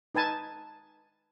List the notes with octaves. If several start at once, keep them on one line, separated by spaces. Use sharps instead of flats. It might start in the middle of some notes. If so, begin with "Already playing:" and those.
D#4 B4 G#5 A5